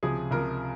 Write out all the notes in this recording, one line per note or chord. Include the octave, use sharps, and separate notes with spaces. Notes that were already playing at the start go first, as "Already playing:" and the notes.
C#2 C3 F3 G#4
C#2 C3 F3 A#4